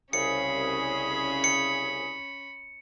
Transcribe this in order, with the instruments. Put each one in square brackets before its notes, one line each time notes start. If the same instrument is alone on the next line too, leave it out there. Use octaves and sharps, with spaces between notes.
[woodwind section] C2 C#3 G#4 [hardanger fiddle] C#4 B5 [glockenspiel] C#7
[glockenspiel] C#7